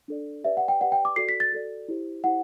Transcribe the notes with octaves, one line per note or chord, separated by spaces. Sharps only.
D4 A4 D5
G4 B4 D5 E5
F#5
G5
G4 B4 D5 F#5
G5
D6
F#4 A4 D5 C7
B6
A6
F#4 A4 D5
E4 G4 C5
E4 G4 C5 F#5